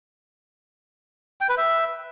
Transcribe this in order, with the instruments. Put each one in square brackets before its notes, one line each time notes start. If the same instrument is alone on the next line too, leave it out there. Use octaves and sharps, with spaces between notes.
[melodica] G5
B4
E5